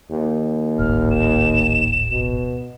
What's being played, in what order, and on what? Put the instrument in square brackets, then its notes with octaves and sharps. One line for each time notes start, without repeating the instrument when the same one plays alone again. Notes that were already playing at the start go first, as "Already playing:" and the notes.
[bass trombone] D#2
[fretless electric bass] D1 G#1 [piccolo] F6
[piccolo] E7
[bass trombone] B2